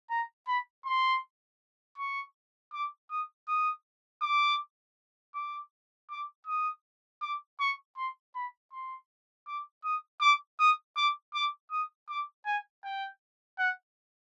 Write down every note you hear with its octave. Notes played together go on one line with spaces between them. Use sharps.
A#5
B5
C6
C#6
D6
D#6
D#6
D6
D6
D6
D#6
D6
C#6
C6
B5
C6
D6
D#6
D6
D#6
D6
D6
D#6
D6
G#5
G5
F#5